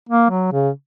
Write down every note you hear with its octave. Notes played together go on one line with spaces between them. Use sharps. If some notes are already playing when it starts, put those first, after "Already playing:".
A#3
F#3
C#3